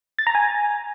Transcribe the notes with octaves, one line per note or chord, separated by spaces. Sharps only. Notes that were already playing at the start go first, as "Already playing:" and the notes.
A6
A#5
G#5